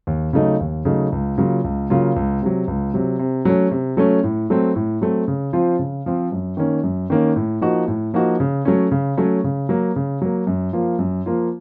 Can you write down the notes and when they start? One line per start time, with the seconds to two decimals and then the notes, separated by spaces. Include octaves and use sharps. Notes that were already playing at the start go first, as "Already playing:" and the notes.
0.07 D#2
0.33 C#3 F#3 A3 D#4
0.60 D#2
0.85 C#3 F#3 A3 D#4
1.12 C#2
1.38 C#3 F#3 A#3 F4
1.64 C#2
1.90 C#3 F#3 A#3 F4
2.16 C#2
2.42 C3 F#3
2.67 C#2
2.94 C3 F#3
3.19 C3
3.45 F#3 A3 C#4
3.71 C3
3.97 F#3 A3 C#4
4.24 A2
4.50 F#3 A3 C4
4.76 A2
5.01 F#3 A3 C4
5.28 C#3
5.53 F3 C4 F4
5.79 C#3
6.06 F3 C4 F4
6.32 F#2
6.57 D#3 A#3 C#4
6.84 F#2
7.10 D#3 A#3 C#4
7.36 A2
7.61 F3 A#3 D#4 F#4
7.88 A2
8.14 F3 A#3 D#4 F#4
8.40 C#3
8.65 F#3 A3 C#4
8.91 C#3
9.17 F#3 A3 C#4
9.44 C#3
9.69 F#3 A#3
9.96 C#3
10.22 F#3 A#3
10.47 F#2
10.73 F3 A#3 F4
10.99 F#2
11.26 F3 A#3 F4